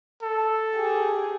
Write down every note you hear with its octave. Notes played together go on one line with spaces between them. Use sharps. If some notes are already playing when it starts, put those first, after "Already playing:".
A4
G4 G#4